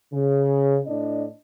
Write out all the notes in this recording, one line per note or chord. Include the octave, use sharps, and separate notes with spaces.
C#3
A2 D4 D5 D#5